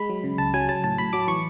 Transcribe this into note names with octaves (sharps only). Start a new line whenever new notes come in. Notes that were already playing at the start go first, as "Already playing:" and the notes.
Already playing: G#3 B5
F#3
C#3
C#2 A5
F#3 G#5
F#3 A5
A2 A5
A2 B5
F#3 D6
E3 C#6